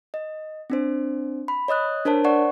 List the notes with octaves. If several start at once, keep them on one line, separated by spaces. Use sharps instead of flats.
D#5
C4 D4 C5
B5
C#5 D#5 D#6 F#6
D4 A#4 C5 C#5 A5
C5 D5 F#5 C#6